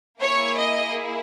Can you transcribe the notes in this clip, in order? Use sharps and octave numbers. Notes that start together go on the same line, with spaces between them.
A#3 E4 G#4 C#5
D#5